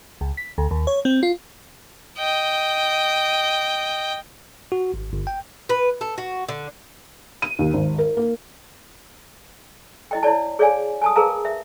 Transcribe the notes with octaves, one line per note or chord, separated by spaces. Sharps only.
C#2
B6
D2
D#2
C#5
C4
F4
D#5 G5
F#4
G#1
G1
G5
B4
A4
F#4
D3
D#7
D#2
G#1
A#4
A#3
E4 D#5 G5
E4 C#5 D5 A5
G#4 C#5 D5 F5 G#5
G#5 A5 D#6
G#4 A#4 B4 F5 A5 A#5
E5